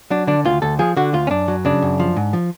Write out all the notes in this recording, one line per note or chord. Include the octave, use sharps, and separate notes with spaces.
F#3 D4
D3 D4
D2 F4
D2 A4
F3 G#4
D3 F#4
D2 F4
C#4
F#2 D4
F#3
C#3 D4
F#2
F3
G#2
F3